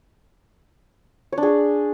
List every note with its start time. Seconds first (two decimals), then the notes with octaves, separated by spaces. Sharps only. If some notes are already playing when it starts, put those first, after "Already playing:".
1.32 C#5
1.38 D4
1.43 G#4